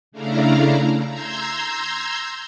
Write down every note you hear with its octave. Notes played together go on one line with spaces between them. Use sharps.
C#3 A3 D4 E4 F5 A#5
A#5 C6 E6 G6 G#6